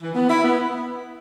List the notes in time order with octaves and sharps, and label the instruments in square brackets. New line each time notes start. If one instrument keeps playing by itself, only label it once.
[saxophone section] E3
B3
E4
B3